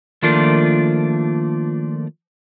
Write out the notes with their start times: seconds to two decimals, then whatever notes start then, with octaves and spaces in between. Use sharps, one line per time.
0.22 D#3 F3 A3 A#3 D4 F4